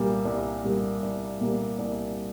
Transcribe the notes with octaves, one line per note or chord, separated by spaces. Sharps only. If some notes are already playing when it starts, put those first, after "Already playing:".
Already playing: C2 A#2 G3 A#3
C2
A#2 G3 A#3
C2
A#2 G3 A#3
C2